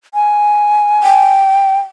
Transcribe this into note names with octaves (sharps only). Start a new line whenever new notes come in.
G#5
G5